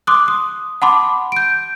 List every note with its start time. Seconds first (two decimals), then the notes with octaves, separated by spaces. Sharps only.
0.07 C6 D6 D#6 F#6
0.28 D#6
0.82 F#5 A5 B5 C6 D6
1.32 G6 D7